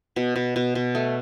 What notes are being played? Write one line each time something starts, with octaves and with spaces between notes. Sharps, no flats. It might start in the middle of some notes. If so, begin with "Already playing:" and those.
B2
B2
B2
B2
A3